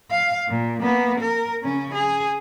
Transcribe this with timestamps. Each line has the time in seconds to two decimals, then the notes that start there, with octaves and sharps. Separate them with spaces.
0.11 F5
0.49 A#2
0.81 A#3 B3
1.20 A#4
1.63 C#3 C#4
1.94 G#4